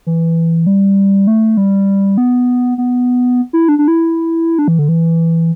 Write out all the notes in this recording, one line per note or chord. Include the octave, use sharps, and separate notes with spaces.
E3
G3
A3
G3
B3
B3
E4
D4
D4
E4
D4
E3
D3
E3